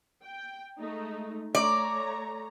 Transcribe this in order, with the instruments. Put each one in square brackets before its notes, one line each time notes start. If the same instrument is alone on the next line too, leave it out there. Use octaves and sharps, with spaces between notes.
[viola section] G5
G#3 A3 D#4
[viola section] A3 C#5 A#5 [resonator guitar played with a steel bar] D5